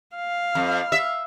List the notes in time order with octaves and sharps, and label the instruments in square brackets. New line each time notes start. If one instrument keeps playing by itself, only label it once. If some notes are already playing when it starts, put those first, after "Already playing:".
[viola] F5
[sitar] F2
E5